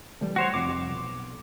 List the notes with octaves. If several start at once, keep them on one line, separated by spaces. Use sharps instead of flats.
E3 G3 A3
F#4 C5 C#5
F1 F2 D6
B1